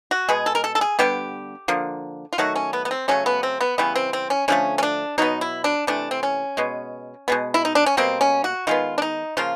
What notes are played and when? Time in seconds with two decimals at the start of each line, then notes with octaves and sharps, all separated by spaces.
0.11 F#4
0.28 B2 G#3 B3 G#4
0.46 A4
0.55 A#4
0.64 A4
0.75 A4
0.81 G#4
0.99 D3 G3 B3 G4
1.68 D3 F3 A#3
2.33 F4
2.38 D#3 F#3 A3 F#4
2.55 C#4
2.73 B3
2.85 B3
2.91 C4
3.08 C#3 F#3 A3 C#4
3.26 B3
3.43 C4
3.61 B3
3.78 C#3 E3 G3 B3
3.96 C4
4.13 C4
4.30 C#4
4.48 D3 F3 A3 C#4
4.78 C#4
4.83 D4
5.18 B2 F#3 B3 D#4
5.41 E4
5.64 D4
5.87 C3 E3 A3 D4
6.11 C4
6.23 C#4
6.57 B2 G#3 B3
7.28 B2 G#3 B3
7.54 E4
7.65 D#4
7.75 D4
7.86 C#4
7.97 B2 G3 A#3 C4
8.21 C#4
8.44 F#4
8.67 D#3 G#3 B3 F4
8.98 D4
9.02 D#4
9.37 C#3 F3 A#3 F4